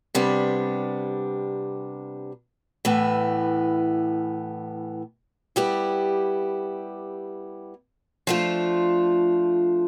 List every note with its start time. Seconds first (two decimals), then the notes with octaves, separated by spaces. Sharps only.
0.15 C3 G3 B3 D4
2.85 A2 E3 B3
5.56 G3 B3 E4 G4
8.27 F3 A3 D4 F4